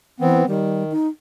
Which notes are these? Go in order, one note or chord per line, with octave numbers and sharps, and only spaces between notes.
E3 B3 C4
D#3 G3
D#4